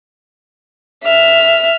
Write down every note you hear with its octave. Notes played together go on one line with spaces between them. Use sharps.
E5 F6